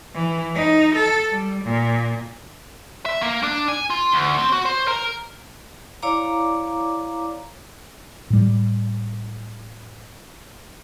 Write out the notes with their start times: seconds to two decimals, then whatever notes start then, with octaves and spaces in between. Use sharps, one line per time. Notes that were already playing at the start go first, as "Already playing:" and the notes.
0.14 E3
0.55 D#4
0.95 A4
1.32 G3
1.64 A#2
3.06 E5
3.22 A#3
3.43 D4
3.68 G#5
3.90 F4
4.14 D2
4.38 C4
4.52 F#4
4.65 C5
4.88 A#4
6.02 E4 C#5 D5 F5 A#5 D6
8.30 A2 G3